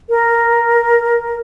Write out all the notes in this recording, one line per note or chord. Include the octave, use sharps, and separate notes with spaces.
A#4